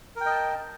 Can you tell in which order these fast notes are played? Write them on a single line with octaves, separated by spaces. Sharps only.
A#4 G5 D#5 A5